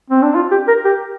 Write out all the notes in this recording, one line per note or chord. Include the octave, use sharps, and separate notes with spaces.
C4
D4
F4
G4
A#4
G4